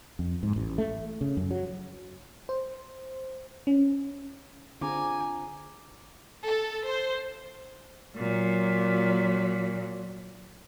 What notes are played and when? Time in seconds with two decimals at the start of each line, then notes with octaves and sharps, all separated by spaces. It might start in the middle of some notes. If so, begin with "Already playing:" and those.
0.19 F2
0.43 G#2
0.56 A1
0.78 A3
1.21 C#3
1.37 F#2
1.51 F#3
2.49 C5
3.67 C#4
4.81 D3 C4 D4 F4 G#4 G#5 A#5 D6
6.45 A4
6.89 C5
8.16 A#2 F#3